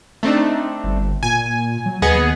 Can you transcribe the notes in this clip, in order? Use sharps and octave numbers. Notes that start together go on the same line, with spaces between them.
A3 C4 D4 D#4
G1
A#2 G#5
F#3
D#2 B3 G#4 D#5